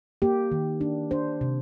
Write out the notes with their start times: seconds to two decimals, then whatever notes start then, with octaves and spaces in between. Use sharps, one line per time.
0.22 A#3 G4
0.52 D#3
0.81 D4
1.11 D4 C5
1.41 C3